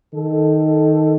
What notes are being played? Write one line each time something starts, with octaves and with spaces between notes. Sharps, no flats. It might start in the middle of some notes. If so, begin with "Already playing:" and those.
D#3 A4